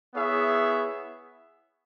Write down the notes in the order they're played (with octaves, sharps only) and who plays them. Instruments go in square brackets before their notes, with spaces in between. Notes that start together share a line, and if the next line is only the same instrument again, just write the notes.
[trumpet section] B3 E4 G#4 C#5 E5